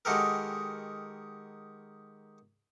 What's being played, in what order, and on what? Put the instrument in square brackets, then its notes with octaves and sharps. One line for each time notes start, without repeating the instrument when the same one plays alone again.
[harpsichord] D#3 G#3 F#4 G4 A4 A#4